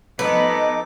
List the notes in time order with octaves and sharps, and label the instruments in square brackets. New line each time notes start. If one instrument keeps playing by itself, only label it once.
[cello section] F3 B3 [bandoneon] D#4 A4 D6 [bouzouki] B4 [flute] D#5